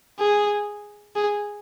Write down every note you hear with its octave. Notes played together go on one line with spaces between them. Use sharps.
G#4
G#4